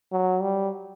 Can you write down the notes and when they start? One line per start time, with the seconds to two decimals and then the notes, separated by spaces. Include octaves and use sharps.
0.12 F#3
0.42 G3